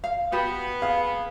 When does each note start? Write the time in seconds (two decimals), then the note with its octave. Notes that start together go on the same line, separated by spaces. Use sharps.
0.04 F5
0.32 B3 F#4 G4
0.82 G#4 F5